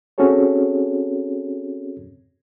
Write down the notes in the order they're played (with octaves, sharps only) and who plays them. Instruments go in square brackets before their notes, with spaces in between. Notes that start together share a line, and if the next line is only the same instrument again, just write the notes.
[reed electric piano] C4 C#4 F#4 G#4 A4 C#5